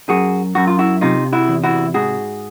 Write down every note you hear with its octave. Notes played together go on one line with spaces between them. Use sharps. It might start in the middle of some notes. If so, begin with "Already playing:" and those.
F#2 F#4 G#4
F#2 F#4
F4
E4 F#4
C3 D#4 F4
E4 F#4
E2
E4 F#4
G#2 F#4 G#4